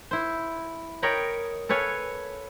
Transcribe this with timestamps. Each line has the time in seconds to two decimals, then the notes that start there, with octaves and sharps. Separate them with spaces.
0.11 E4 C5
1.02 A#4 C#5 D#5 G5 A#5 B5
1.69 A4 B4 C#5 F5 G#5